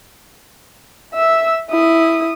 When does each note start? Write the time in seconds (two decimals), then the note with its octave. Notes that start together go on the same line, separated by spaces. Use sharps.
1.14 E5 E6
1.70 E4 D#6